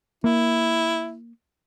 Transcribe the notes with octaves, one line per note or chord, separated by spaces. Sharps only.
A#3 E4